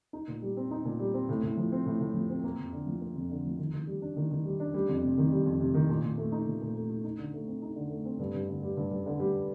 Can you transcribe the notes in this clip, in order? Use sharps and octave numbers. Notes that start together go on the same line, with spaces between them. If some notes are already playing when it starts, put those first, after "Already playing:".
D#4
A#2
G3
C4
D#4
A#2
G3
C4
A2
A2
F3
C4
A2
A2
F3
C4
A#3
F2
D3
F3
A#3
F2
D3
F3
D#3
D#3
G3
D4
D#3
D#3
G3
D4
G3
F2
C3
D#3
G3
F2
C3
D#3
A#2
A#2
A3
D#4
A#2
A#2
A3
D#4
D#4
D3
A3
C4
D#4
D3
A3
C4
G2
G2
D3
G3
G2
G2
D3
G3